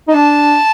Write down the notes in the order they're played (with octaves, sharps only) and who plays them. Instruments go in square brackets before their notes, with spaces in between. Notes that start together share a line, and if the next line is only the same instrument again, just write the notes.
[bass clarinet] D#4
[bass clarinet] D4 [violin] A5